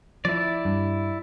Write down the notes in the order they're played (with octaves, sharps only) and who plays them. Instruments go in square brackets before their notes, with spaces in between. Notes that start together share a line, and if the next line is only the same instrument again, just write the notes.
[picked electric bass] F3 [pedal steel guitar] E4 D5
[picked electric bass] G2